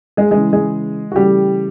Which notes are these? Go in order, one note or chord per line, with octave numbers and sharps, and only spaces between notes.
G#3 G#4
C#3 E3 G#3 G#4
G#3 G#4
F#4
C#3 E3 G3 A3 G4